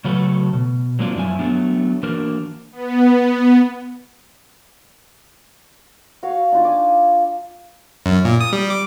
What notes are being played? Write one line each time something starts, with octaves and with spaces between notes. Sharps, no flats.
C#3 F#3 A3 F#4 A4 B4
B2
F#3 G#3 A#3 C4 D4 F4
F#2 F3 E4 G#5
F#3 A3 B3 D4
E3 A#3 D4 F#4 A#4
B3
F#4 C#5 F5 F#5
D4 D#4 F4
G#5 D6
F#2
A#2
D#6
G3
D6